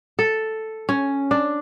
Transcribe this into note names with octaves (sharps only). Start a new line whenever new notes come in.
A4
C#4
D4